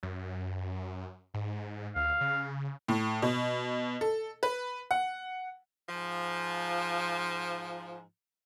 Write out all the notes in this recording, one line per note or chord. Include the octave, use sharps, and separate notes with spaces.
F#2
G#2
D2 F5
C#3
A2
B2
A4
B4
F#5
G#2 F3